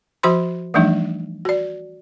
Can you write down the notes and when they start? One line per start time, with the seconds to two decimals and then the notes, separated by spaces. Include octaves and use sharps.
0.23 F3 F#4 C5 B5 C6
0.74 E3 F3 G3 A3 D4 D#4
1.45 F#4 D5